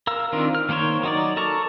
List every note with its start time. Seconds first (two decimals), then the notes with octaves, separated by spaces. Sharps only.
0.07 A#4 F5 E6
0.32 D#3 C4 D4 F4 A#4
0.55 F6
0.69 D#3 A#3 A#4 C5 C#5
1.03 F#3 D#4 D5
1.37 A4 A#4 A5 A#5 C#6